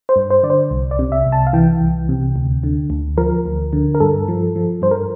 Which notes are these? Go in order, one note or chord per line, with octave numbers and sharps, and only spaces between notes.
C5
G2
C5
D3 D5
C5
C2
D5
C3
E5
C2
A5
F5
E3 G5
C2
C3
D2
D3
D2
F3 A#4
D2
D3
A#4
G2 A4
F3
F3
G2 C5
A#4